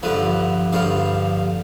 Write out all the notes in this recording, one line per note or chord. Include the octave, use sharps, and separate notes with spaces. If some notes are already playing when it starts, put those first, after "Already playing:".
G2 D3 F3 B4
G2 D3 F3 F5